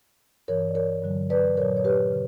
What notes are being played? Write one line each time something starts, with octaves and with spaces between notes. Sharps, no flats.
G2 E3 A#4 C#5
D5
A#4 C#5
G2 D3 F#3
B4 D5
A#2 F#3 A#4 C#5
C#5
G4 B4
C#3